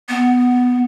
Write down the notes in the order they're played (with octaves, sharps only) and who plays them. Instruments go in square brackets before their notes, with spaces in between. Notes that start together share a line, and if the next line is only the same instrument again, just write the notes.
[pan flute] B3